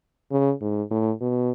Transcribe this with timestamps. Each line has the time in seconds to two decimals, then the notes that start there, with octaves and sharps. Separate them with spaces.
0.31 C#3
0.61 G#2
0.91 A2
1.21 B2